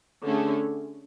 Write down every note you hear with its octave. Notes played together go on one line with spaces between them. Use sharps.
D3 A3 C#4 G#4